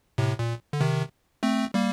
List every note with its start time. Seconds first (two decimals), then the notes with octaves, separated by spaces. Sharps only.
0.18 A2 C3
0.39 A#2
0.73 D3
0.80 C3 D#3
1.43 A3 C4
1.74 G3 A#3